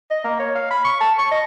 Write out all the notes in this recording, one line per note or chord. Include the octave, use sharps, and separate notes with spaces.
D#5
A#3
C#5
F5
B5
C#6
A5
C#6
D#5